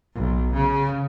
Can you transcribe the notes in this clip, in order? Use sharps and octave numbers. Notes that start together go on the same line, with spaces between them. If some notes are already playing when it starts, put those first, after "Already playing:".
B1
C#3